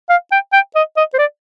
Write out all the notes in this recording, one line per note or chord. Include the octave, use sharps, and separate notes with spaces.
F5
G5
G5
D#5
D#5
C5
D5